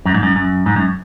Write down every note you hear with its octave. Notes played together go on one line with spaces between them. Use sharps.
F#2
G#2
F#2
F#2
G#2
F#2